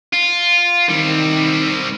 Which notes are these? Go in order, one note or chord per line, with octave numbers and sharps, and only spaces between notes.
F4
D#3 G3 C4